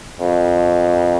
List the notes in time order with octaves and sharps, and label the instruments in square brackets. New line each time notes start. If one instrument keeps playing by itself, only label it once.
[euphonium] F2